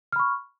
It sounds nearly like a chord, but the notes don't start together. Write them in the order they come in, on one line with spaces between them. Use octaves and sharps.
F6 B5 C#6